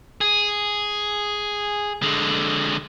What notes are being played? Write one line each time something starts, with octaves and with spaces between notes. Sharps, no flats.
G#4
D3 G#3